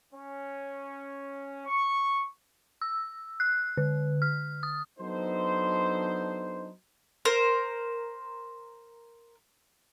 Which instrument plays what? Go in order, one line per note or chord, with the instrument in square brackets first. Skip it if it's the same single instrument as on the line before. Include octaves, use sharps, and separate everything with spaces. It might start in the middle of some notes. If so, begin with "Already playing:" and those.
[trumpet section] C#4
C#6
[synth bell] E6
F#6
D3
F6
D#6
[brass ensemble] F#3 B3 D4 D#4 A4 C5
[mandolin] A#4 C5